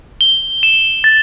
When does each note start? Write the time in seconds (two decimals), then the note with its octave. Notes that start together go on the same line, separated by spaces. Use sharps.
0.21 G7
0.63 E7
1.04 A6